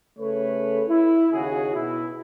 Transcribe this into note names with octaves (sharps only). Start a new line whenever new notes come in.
C#3 A3 A4 B4 C#5
E4
D#2 C#3 E4 F#4 G#4
B2 E4